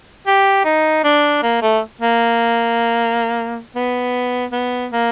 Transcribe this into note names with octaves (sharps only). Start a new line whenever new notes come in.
G4
D#4
D4
A#3
A3
A#3
B3
B3
A#3